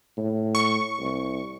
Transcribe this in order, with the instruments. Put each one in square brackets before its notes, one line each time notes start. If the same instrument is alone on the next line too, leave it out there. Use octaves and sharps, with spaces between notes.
[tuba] A2
[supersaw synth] C#6
[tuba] C2